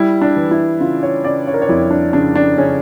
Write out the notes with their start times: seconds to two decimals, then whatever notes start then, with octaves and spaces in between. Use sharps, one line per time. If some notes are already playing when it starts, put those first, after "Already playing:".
Already playing: G3 E4
0.22 D4
0.36 E3
0.51 E4
0.80 C#3 F4
1.03 C#5
1.24 C#3 D5
1.47 C#5
1.54 A#4
1.62 C#5
1.69 F2 E4
1.91 D4
2.13 C#3 D4
2.36 D4
2.58 C#3 C#4